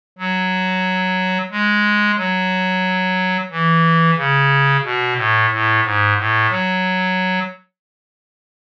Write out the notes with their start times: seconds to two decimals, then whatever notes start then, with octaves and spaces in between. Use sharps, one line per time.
0.18 F#3
1.51 G#3
2.17 F#3
3.51 E3
4.17 C#3
4.84 B2
5.16 A2
5.50 A2
5.84 G#2
6.17 A2
6.50 F#3